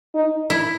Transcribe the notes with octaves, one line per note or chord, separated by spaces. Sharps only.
D#4
E4